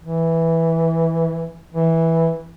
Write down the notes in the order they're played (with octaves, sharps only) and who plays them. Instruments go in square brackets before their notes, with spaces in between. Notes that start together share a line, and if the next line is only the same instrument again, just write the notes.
[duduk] E3
E3